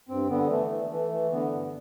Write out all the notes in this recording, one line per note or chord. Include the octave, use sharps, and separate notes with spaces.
G2 C4
D3 B3
E3 A3
E3
E3 A3
E3
D3 B3
G2